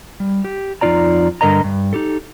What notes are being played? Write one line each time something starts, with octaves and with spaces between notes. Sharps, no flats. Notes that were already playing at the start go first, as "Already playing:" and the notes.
G3
G4
F2 C#3 D#4 F4 D5 A#5
G2 D3 A#4 D#5 A#5
G2
D#4 G4 A4